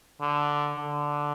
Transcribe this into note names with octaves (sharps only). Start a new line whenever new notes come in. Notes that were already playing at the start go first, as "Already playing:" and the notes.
D3
D3